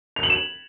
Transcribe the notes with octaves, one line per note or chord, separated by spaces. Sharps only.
F7
F#7
E7